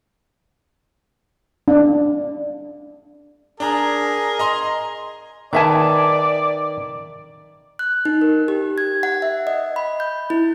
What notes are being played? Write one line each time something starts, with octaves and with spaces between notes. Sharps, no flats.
D4
D4 G#4 A#4 A#5
D#5 A#5 C6
D#3 B4 D5 E5 G#5 A5
F#6
D#4
A#4
G4
G#6
F#5
E5
D#5
B5
G6
E4